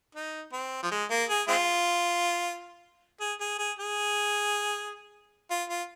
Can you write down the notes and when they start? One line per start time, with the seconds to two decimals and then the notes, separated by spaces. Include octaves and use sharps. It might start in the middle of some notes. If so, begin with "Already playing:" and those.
0.15 D#4
0.53 C4
0.83 F3
0.91 G#3
1.11 A#3
1.29 G#4
1.48 G#3 C4 F4
3.20 G#4
3.40 G#4
3.59 G#4
3.79 G#4
5.50 F4
5.69 F4